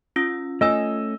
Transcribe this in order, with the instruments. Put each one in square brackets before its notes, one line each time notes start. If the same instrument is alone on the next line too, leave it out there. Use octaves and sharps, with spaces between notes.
[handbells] C#4 F4 E6
[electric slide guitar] A3 C#4 [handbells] F4 G#5 [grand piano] D#5 E6